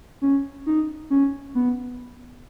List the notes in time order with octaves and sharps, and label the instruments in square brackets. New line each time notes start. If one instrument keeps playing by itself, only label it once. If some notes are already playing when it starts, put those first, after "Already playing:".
[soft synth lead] C#4
D#4
C#4
B3